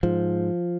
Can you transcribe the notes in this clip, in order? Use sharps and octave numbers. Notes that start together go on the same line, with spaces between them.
G#2 F3